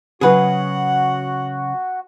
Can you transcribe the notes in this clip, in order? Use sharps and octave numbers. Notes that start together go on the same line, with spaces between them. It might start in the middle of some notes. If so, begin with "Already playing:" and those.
C#3 F#3 F#4 G#4 B4 F#5